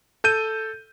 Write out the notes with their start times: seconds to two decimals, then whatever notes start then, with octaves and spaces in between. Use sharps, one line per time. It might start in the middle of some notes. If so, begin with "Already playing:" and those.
0.24 A4 G6 D#7